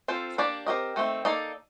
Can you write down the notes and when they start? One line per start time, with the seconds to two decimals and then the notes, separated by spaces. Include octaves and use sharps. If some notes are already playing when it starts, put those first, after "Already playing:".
0.08 C4 F4 A4 C5
0.38 A#3 D4 G4 D5
0.66 C4 G4 A#4 D#5
0.96 D#3 A3 C4
1.25 A#3 D#4 A4 D5